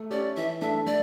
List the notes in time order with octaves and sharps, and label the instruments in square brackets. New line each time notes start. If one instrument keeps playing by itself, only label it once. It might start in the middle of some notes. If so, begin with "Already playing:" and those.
Already playing: [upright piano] A3
[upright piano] C#4 G4 [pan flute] D5
[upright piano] E3 [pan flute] E5
[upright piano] A3 D4 A4 [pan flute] E5
[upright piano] A3 [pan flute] D5